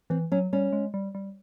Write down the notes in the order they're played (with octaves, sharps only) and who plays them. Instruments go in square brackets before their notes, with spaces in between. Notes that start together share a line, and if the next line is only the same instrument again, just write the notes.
[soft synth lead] E3 [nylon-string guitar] C4
[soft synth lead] F#3 [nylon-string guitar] C#4
[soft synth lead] G3 [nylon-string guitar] C#4
[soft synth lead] G#3
G3
G3